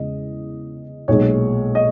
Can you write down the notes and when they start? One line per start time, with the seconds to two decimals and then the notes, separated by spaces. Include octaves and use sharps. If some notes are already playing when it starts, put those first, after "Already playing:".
Already playing: E2 C#3 G#3 D#5
1.08 B1 A#2 G#3 C#5
1.75 D#5